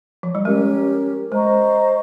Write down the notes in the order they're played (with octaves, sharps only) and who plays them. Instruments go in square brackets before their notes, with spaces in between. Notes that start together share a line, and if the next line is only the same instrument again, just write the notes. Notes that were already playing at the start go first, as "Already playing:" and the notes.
[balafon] F3
G3
[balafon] G#3 [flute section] C#4 G4 A#4
[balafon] G#3 [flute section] C5 D#5 A#5 C#6